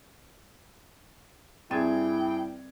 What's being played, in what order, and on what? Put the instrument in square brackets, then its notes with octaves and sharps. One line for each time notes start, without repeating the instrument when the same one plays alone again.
[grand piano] G2 G#4 G#6 [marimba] C4 E5 A6 [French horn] E4 [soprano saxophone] G5